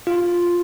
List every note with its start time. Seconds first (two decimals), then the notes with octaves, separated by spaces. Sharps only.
0.07 F4